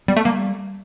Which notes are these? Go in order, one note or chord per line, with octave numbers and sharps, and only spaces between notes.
G3 B3
A3
G3 A#3